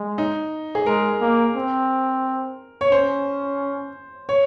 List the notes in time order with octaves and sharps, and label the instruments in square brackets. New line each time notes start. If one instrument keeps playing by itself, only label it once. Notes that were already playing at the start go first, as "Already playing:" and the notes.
Already playing: [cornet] G#3
[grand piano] D#4
G#4
[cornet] G#3 [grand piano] A#4
[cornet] A#3
C4
[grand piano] C#5
[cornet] C#4 [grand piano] C5
[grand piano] C#5